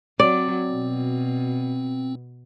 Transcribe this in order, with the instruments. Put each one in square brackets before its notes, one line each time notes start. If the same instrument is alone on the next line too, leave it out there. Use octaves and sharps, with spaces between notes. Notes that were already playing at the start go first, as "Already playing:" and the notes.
[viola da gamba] F#3 [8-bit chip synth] C4 [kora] D5
[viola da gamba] B2